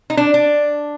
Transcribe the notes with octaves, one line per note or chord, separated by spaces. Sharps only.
D#4
D4
D4